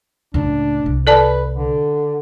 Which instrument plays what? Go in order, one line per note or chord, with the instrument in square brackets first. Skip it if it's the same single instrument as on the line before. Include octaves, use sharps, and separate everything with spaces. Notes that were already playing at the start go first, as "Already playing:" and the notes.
[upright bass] C#2 A2 [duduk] D4
[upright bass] C2
[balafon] A4 D5 A5 [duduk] B4
[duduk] D3